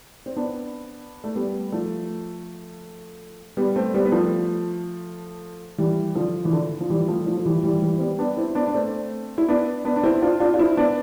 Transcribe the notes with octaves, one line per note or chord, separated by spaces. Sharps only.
C4
B3 D4
A3
G3 B3
F3 A3
G3 B3
A3 C4
G3 B3
B3
F3 A3
E3 G3
D3 F3
E3
D3
F3
E3 G3
F3 A3
F3 A3
F3
E3 G3
E3 G3
E3 G3
C4
G3 B3
B3 D4
C4 E4
B3 D4
D4
A3 C4
E4
B3 D4
B3 D4
D4
C4 E4
D4 F4
D4 F4
F4
C4 E4
B3 D4